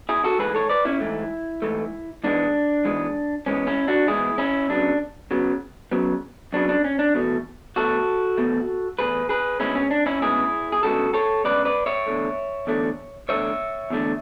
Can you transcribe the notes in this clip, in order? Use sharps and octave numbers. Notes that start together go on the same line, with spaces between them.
E4 G#4
F#4 A4
G#2 E3 A3 G#4 B4
A4 C#5
B4 D5
C#4 E4
G#2 E3 A3
G#2 E3 A3
G#2 E3 G#3 B3 D4
G#2 E3 G#3 B3
G#2 E3 G#3 B3 C#4
C#4 E4
D4 F#4
G#2 E3 G#3 B3 E4 G#4
C#4 E4
F#2 C#3 F#3 B3 D4
F#2 C#3 F#3 B3
F#2 C#3 F#3 B3
F#2 C#3 F#3 B3 D4
D4
C#4
D4
E2 B2 A3
E2 B2 A3 F#4 A4
E2 B2 A3
E2 B2 A3 G#4 B4
G#4 B4
D2 C#3 G#3 B3 C#4 E4
C#4
D4
C#4 E4
D2 C#3 G#3 B3 E4 G#4
G#4
D2 C#3 G#3 B3 F#4 A4
A4 C#5
D2 C#3 G#3 B3 B4 D5
B4 D5
C#5 E5
E2 D3 A3
E2 D3 A3
E2 D3 A3 C#5 E5
E2 D3 A3